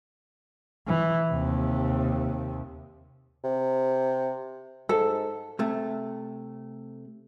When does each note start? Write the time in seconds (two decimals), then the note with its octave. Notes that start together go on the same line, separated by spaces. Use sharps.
0.87 E3
1.29 D#2 C3
3.44 C3
4.89 G#2 A4
5.59 C3 A3